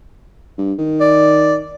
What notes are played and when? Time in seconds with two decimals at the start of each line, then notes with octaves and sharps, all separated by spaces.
0.58 G2
0.79 D#3
1.01 D5